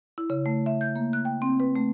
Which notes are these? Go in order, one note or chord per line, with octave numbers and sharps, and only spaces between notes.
E4
C#3
A3
E5
G6
A#3
F#6
G5
C4
B4
A3